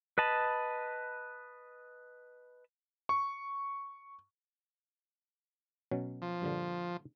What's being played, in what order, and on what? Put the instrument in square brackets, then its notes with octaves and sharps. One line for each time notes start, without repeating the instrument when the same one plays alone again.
[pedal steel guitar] B4 D#5 A5 B5
[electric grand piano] C#6
[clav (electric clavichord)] B2 F#3 C#4
[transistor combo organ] F3
[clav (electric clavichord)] G2 A#2 D3